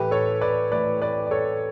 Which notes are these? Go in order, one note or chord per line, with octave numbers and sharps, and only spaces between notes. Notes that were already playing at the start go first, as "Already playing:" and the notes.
Already playing: A2 E3 A3 G4 B4
A4 C#5
B4 D5
A2 E3 A3 B4 D5
B4 D5
D5
A4 C#5